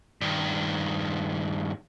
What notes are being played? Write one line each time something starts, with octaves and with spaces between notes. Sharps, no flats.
G2 D#3